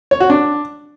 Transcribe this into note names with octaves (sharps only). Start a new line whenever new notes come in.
C#5
F#4
D4